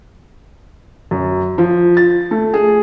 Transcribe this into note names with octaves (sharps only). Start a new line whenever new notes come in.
F#2
F3
A6
A3
G#4